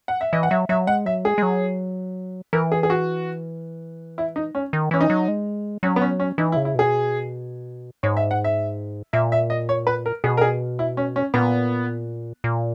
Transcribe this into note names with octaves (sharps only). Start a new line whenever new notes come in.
F#5
E5
E3 D#5
F#5
F#3 E5
F#3 E5
G#3 F#5
F#3 E5
G#3 G#4
G#3
F#3
E3 A#4
G#4
G#4
F#4
E4
D#4
C#4
D#3
E3 C#4
D#4
F#3
G#3
F#3 C#4
B3
C#4
C#4
E3 D#4
E4
C#3
E4
B2 G#4
G#2 C#5
E5
F#5
E5
A#2 E5
E5
D#5
C#5
B4
A#4
B2 G#4
A#4
G#4
E4
C#4
C#4
A#2 B3
A#2